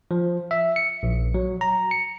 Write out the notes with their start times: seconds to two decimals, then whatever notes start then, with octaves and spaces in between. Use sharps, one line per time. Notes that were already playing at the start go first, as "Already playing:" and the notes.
0.11 F3
0.51 E5
0.76 C#7
1.03 A#1
1.34 F#3
1.61 A#5
1.91 C#7